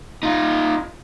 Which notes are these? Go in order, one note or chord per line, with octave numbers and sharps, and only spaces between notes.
D#4 F4